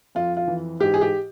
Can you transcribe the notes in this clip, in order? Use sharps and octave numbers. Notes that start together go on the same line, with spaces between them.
F2 F4
F4
E3
G#2 G4
G#4
G4